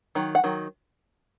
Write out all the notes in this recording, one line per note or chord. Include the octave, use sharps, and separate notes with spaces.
D#3 F#3
F#5
D#3 F#3